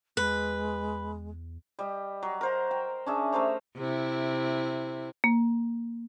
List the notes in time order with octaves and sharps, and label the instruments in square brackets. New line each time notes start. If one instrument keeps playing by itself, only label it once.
[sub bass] E2 [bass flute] G#3 [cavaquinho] B4
[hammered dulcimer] G3 D#5
F#3
A#4 C5 F#5
G5
C#4 D4 G#4 E5
A3 A#4 C5 C#5
[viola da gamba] C3 E4
[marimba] A#3